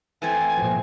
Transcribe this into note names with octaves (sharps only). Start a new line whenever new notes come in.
E3 A3 C4 G#5
A#2 F3